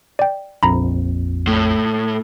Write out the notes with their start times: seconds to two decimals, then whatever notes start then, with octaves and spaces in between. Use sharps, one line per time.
0.19 D5 G5
0.63 A#1 F2 A#5 B5
1.47 A2